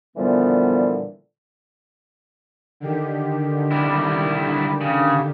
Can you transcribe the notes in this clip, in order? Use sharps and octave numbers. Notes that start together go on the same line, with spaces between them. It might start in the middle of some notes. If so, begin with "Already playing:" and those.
A#2 D3 E3 F3 G3 B3
D3 D#3 G4
G3 E4
C#3